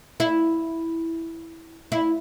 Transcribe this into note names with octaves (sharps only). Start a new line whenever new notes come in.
E4
E4